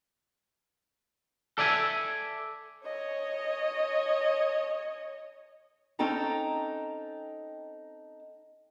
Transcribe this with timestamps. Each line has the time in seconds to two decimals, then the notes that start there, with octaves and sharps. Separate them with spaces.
1.58 A4 D5 E5 G#5
2.85 C#5 D#5
5.99 C4 C#4 D#4 A4 G5 A#5